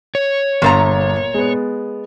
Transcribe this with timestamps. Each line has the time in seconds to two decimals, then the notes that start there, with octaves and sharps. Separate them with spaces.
0.15 C#5
0.62 G1 A#2 C5 A#5 A6
1.34 G#3 B3